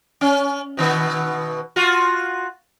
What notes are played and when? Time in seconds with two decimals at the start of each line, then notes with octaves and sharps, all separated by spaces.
0.21 C#4
0.77 B2 D#3 B3
1.76 F4 F#4